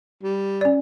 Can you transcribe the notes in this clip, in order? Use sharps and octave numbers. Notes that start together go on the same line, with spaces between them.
G3
C#4 D5